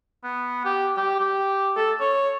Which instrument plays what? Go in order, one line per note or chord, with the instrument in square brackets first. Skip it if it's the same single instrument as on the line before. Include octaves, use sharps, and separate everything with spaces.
[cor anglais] B3
G4
G4
G4
A4
C#5